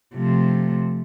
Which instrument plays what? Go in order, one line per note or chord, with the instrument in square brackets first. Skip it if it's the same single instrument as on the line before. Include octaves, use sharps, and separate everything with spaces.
[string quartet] C3 F3 A3